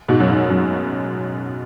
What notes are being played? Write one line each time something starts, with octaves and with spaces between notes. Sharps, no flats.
G#2 B2
F#2
G#2
F#2